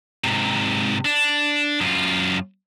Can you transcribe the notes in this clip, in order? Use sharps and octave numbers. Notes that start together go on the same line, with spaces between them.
G#2 C3
D4
F#2 F4